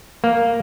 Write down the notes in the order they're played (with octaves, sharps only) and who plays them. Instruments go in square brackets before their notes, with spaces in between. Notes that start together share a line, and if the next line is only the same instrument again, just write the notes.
[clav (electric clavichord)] A#3